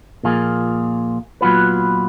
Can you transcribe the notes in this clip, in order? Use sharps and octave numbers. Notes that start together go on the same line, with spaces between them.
A#2 F3 A#3 F4 G#4
A#2 F#3 B3 F4 B4